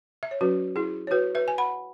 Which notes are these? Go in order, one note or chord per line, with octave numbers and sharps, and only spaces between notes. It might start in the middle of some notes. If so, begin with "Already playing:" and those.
E5
C#5
F#3 C#4 F#4 B4
E4 G#4
C#5
F#4 B4
B4 E5
G#5
F#5 B5